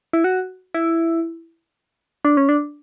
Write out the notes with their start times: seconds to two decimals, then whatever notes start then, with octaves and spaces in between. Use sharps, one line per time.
0.13 E4
0.24 F#4
0.74 E4
2.25 D4
2.37 C#4
2.49 D4